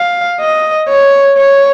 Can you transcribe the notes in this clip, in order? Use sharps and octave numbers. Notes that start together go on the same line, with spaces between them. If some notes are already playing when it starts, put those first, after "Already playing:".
Already playing: F5
D#5
C#5
C#5